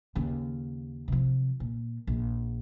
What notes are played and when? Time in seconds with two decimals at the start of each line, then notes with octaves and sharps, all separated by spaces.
0.15 D#2 C#3
1.08 C3 F3
1.60 A#2
2.07 A#1